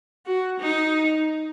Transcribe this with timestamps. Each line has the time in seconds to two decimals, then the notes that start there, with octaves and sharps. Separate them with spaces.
0.26 F#4
0.60 D#4